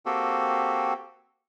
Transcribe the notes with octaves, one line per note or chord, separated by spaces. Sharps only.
A#3 C4 F#4 G4 A4